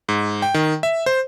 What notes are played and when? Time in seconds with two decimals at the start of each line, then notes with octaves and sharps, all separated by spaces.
0.09 G#2
0.42 G5
0.54 D#3
0.83 E5
1.06 C5